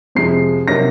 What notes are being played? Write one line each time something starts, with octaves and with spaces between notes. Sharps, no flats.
F2 C3 F3 G#3 C7
C3 F#3 A#3 D#4 A#6